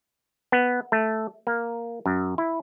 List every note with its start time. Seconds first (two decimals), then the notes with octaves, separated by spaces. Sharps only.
0.52 B3
0.92 A3
1.47 A#3
2.06 F#2
2.38 E4